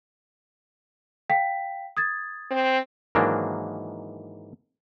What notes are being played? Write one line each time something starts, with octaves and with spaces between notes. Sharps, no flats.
F5 G5 B6
D#6 G#6 A6
C4
G#2 D#3 E3 F#3 A#3 D4